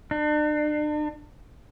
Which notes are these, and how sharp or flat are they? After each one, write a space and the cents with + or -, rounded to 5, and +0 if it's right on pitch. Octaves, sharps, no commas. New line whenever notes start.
D4 +40